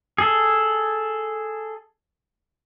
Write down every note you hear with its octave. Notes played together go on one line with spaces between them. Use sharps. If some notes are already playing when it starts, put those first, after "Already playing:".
G#4 A4